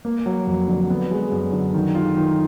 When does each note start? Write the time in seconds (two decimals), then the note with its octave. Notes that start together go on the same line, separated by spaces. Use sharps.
0.05 A#3
0.26 F#3
0.47 F2
0.68 D3
0.90 B3
1.11 G#3
1.32 F#2
1.53 D3
1.74 D#3
1.95 F4
2.17 D#3